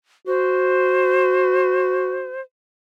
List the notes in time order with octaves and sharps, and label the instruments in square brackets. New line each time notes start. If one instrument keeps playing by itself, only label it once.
[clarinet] F#4 [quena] C5